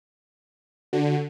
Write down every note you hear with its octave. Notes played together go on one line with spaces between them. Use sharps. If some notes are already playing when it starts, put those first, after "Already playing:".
D3 F#4